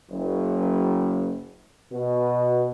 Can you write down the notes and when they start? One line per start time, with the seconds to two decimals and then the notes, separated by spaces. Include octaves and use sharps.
0.11 F#1
1.92 B2